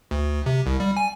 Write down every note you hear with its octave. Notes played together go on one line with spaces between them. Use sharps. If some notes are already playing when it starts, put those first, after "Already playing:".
D2
C3
C2
G3
G#5